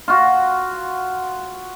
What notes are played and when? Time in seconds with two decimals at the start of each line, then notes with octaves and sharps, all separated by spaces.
0.08 F4 F#4